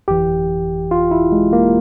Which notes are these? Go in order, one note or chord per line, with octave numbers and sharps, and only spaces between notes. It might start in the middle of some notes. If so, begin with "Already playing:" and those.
G1 F2 E3 G4
F4
E4
G#3
A#3